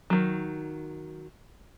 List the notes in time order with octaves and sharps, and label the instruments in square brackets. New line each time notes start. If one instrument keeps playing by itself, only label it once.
[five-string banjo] D#3 F#3